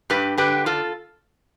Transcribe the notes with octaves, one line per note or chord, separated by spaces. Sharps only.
G2 G4 B4
D3 G4 B4
F4 A4